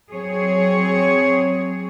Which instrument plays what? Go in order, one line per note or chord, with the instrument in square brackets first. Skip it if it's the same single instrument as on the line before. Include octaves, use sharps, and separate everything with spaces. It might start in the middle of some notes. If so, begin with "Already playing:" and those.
[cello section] F#3 C4 G#4 C#5